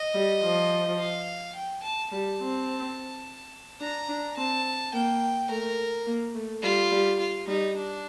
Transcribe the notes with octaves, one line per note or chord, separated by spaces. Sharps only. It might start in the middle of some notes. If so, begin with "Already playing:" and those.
Already playing: D#5
G3
F3
F5
G5
A5
G3 A5
C4
D4 A#5
D4
C4 A5
A#3 G5
A3 A#4
A#3
A3
G3 F4
G3
F4
G3 D#4
D4